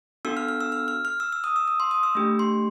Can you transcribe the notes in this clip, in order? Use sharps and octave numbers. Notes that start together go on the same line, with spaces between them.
B3 D4 F#4 A4 E6
F6
F6
E6
F6
F6
F6
E6
E6
D#6
E6
D#6
C6
D#6
E6
A3 D4 G4
C6